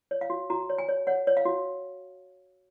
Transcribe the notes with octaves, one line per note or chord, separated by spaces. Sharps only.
C#5
F5
F#4
F#4 A#5
C#5
G#5
C#5
C#5 F#5
C#5
F5
F#4